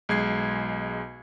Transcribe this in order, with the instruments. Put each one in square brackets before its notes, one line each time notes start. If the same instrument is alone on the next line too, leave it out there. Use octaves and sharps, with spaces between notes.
[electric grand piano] B1 G#3 G#6 C7